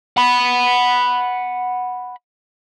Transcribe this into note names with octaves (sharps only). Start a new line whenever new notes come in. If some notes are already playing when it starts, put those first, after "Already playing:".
F#5 B5